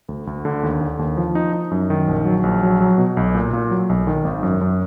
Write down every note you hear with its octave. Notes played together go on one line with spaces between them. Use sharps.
D2
D2
D3
D#2
D3
D#2
F3
D#4
D#4
F#2
D#3
A#1
F#3
A#1
F#3
F#3
B2
B1
A#2
A#2
F#3
B1
D#3
G#1
F#2
F#2